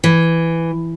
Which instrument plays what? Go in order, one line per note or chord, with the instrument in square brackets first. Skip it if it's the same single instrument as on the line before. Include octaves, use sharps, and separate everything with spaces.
[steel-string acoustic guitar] E3